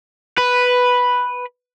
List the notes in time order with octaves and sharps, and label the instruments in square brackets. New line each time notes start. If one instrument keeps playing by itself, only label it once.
[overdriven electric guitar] B4